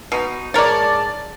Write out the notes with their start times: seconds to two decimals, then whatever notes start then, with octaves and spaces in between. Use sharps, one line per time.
0.12 B2 D#4
0.54 G#2 G#4 A#4 C#5 D5 A5 A6